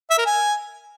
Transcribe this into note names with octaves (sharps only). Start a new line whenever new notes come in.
E5
A#4
G#5